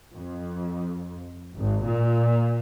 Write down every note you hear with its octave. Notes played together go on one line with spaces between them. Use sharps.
F2
G#1
A#2